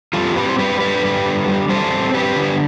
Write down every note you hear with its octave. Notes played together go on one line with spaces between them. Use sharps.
G3 F4 A4
C4 G4 B4
C5
G3 G4 B4
D3 G4 B4
G3
D3
G3
G3 A4 C5
C4
G3 G4 B4
D3